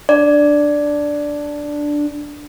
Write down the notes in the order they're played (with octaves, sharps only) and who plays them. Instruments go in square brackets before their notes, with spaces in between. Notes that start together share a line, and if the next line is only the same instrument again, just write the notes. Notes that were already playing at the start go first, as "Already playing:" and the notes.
[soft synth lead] D4 [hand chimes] D5